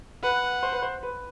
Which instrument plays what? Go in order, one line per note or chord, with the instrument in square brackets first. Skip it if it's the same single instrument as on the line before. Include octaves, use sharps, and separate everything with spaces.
[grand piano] B4 [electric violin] F#5
[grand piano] C5
B4
C5
B4